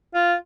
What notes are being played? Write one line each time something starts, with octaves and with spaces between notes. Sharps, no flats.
F4